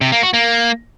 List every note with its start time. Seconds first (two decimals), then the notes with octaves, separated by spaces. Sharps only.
0.01 C3
0.12 A#3
0.23 F#4
0.34 A#3